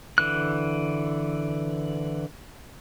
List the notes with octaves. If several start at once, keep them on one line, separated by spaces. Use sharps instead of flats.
D3 E3 F#6